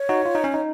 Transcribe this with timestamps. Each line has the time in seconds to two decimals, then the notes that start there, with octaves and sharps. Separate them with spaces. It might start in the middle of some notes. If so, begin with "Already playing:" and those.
Already playing: C#5
0.09 D#4 F#4
0.26 F4
0.35 D#4
0.44 C#4
0.54 D#4